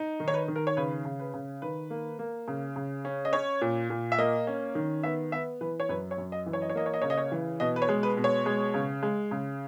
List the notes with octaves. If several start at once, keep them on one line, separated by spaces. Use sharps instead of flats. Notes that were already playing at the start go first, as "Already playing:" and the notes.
Already playing: D#4
D#3
C#5
B4
D#3
A#4
C#5
C#3 B4
C#3
B4
C#3
D#3 B4
A#3
A#3
C#3
C#3
C#4
D#5
C#4 C#5
A#2
A#2
E5
A#3 D#5
C#4
D#3
B3 E5
B3 E5
E3 B4
C#5
F#2 B4
C#5
F#2
D#5
E3
C#5
D#5
C#5
A#3 D#5
C#5
D#5
C#3 C#5
D#5
C#5
E3
B2 D#5
B4
C#5
G#3
B4
B2
C#5
G#3
C#3
G#3
C#3